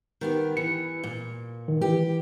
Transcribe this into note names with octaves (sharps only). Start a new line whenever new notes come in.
D#3 B3 G4
E3 C#7
A#2
D#3
E3 G4